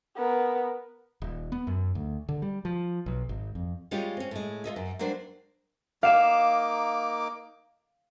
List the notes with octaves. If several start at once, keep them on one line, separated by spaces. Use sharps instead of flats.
B3 A#4
D#1
B3
F#2
D2
D3
G3
F3
B1
G#1
F2
G3 G#3 C#4 F4 G4
C4 C#4
A2 G#3
F4 A4 D#5 E5
F#2
F#3 G3 A#3 D4 C5
A#3 D#4 F5 D6 E7